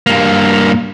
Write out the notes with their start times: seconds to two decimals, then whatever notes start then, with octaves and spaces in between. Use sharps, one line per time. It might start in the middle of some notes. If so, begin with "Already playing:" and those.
0.07 G2 A#3